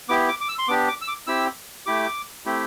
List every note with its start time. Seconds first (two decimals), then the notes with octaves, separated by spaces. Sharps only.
0.09 B3 E4 G4 D6
0.29 D6
0.41 D6
0.49 E6
0.59 C6
0.68 B3 D4 G4 D6
0.88 D6
1.01 E6
1.08 D6
1.27 C4 E4 G4 E6
1.86 A3 E4 G4 D6
2.46 A3 C4 E4 G4